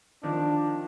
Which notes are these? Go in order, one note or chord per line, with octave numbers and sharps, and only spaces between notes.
D#3 F3 D4